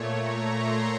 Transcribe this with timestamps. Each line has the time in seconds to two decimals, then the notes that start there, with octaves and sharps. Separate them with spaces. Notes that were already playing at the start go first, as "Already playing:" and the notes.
Already playing: A#2 A3 C#5
0.10 A#5
0.51 C6